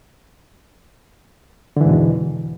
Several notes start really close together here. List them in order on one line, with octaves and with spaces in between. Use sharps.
D3 E3 G#2 B2 E2